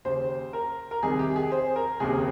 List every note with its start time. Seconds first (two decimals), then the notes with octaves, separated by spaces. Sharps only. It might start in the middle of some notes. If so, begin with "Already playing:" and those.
0.05 D#2 C#3 C5
0.53 A#4
0.91 A#4
1.03 C2 C3 D#3 G#4
1.19 G4
1.36 G#4
1.52 C5
1.76 A#4
2.00 F1 D#2 C#3 G#4